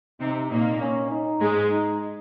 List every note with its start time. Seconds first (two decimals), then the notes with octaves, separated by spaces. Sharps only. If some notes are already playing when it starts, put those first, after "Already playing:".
0.20 C3 C4 D#4
0.50 A#2 A#3 D#4
0.80 C#4
1.10 D#4
1.40 G#2 G#3
1.70 D#4